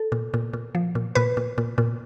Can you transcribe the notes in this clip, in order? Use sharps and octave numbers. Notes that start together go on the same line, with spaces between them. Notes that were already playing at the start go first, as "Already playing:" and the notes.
Already playing: A4
A#2
A#2
A#2
F3
A#2
A#2 B4
A#2
A#2
A#2